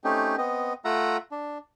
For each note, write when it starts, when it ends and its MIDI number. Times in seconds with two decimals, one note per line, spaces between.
0.04 0.36 57
0.04 0.36 60
0.04 0.36 61
0.04 0.36 63
0.04 0.36 67
0.38 0.73 59
0.38 0.73 60
0.38 0.73 75
0.85 1.17 57
0.85 1.17 65
0.85 1.17 76
0.85 1.17 78
0.85 1.17 82
1.31 1.58 62